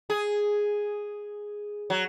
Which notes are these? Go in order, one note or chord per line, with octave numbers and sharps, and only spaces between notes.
G#4
F#3